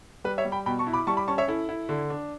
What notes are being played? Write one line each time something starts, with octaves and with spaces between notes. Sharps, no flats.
G3 B4
C#5 E5
G3
G5 B5
B2 G5 B5
A5 C#6
E4
B5 D6
G3 A5 C#6
B5 D6
C#4 A5 C#6
C#5 E5
E4 A4
E4
D3
D4